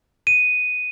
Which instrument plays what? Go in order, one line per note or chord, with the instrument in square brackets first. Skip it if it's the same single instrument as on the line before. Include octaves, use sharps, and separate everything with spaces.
[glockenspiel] D#7